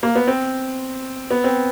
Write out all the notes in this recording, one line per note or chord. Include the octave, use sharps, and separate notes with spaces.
A#3
B3
C4
B3
C4